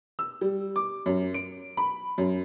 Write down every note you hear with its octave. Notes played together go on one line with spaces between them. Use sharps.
E6
G3
D6
F#2
D7
B5
F#2